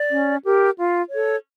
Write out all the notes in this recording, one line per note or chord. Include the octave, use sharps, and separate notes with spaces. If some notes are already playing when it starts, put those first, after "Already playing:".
Already playing: D5
C#4
G4 A#4
F4
A4 C#5